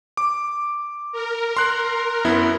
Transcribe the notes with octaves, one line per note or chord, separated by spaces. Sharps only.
D6
A#4
C6 F#6
F#2 B3 E4